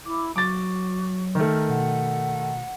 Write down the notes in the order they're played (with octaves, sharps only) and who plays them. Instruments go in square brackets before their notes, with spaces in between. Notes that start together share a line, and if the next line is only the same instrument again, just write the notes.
[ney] E4 [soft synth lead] D6
[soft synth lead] F#3 [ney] F#4 [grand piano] D6 A6
[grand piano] D#3 A3 [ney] A#4
[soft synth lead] B2 [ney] F#5